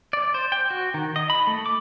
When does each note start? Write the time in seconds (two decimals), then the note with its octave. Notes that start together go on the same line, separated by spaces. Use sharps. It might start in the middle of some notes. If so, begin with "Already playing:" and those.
0.13 D5
0.34 C5
0.52 G5
0.70 F#4
0.94 D#3
1.16 D#5
1.30 B5
1.47 A3
1.66 D6